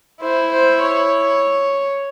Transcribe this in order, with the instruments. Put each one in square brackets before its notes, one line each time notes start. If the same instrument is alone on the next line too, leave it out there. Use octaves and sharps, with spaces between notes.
[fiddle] E4 [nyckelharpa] C5
[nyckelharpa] C5
C#5